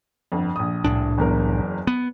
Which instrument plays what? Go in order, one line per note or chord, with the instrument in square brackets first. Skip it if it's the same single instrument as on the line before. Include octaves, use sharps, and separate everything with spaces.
[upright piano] G1 F2
A#1 D#6
[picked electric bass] C2 A2 D4
[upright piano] F#1 E2 A#4
[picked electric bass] B3